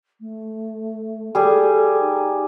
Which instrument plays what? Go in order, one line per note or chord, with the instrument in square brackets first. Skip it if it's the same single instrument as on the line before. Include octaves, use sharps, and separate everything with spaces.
[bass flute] A3
[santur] G3 G#4 [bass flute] A4
[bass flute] D#4